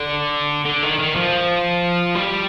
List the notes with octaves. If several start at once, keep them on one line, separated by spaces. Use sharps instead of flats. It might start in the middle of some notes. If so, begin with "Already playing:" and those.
Already playing: D3
D3
D#3
D#3
F3
G3